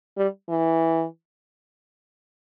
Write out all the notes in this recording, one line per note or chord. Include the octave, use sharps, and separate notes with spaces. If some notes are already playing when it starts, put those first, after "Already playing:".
G3
E3